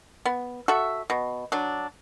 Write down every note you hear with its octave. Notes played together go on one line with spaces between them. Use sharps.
B3
F#4 A4 E5
B2
F#3 D4